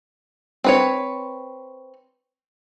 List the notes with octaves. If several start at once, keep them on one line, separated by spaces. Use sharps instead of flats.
C4 B4 C#5